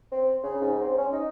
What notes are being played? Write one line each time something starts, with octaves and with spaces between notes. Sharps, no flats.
C4
C#3
G#2
C4
C#4
D#4